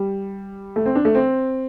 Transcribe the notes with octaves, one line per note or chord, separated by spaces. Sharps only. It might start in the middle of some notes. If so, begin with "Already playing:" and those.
Already playing: G3
A3
C4
D4
A3
C4